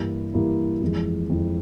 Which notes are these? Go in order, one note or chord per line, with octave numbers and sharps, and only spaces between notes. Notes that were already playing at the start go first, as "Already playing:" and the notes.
Already playing: G2 E3 A#3 E4 G4
G2 E3 A#3 E4 G4
F2 E3 G#3
F2 E3 G#3